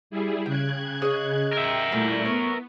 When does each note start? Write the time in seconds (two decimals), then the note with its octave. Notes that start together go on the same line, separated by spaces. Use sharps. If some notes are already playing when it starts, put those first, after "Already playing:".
0.10 G3 E4 G#4
0.46 C#3 G5 F#6 G#6
1.02 G#4 C#5 D#5
1.53 A#4 E5 G5
1.91 A#2 G3 A3 E4
2.25 B3 C#5